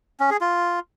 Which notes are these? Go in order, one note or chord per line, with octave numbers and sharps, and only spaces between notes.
C#4
G#4
F4